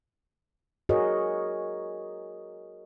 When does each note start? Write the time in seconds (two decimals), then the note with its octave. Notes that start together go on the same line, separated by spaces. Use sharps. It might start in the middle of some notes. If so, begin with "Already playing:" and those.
0.89 F#4 G#4 A#4 C#5 D#5